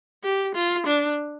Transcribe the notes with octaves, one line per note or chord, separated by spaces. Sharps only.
G4
F4
D4